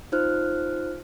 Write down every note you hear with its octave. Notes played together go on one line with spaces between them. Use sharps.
D#4 F4 C5 F6 F#6